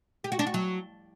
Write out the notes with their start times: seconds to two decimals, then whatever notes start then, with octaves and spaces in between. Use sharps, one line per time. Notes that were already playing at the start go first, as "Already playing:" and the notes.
0.24 G4
0.32 F#4
0.39 D4
0.47 F#4
0.54 F#3